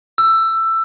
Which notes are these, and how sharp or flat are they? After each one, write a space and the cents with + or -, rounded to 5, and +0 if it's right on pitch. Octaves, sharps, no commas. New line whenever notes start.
E6 +15